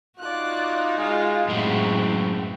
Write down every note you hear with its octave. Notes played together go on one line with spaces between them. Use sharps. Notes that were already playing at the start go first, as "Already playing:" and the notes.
D#4 F4 F#4 D5 F#6
G#3 F4 F5
F#2 A2 G#3 C4 E4 F#4